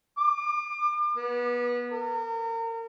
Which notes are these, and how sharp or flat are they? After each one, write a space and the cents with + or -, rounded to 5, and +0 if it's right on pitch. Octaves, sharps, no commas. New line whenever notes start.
D6 +40
B3 -25
A#4 -35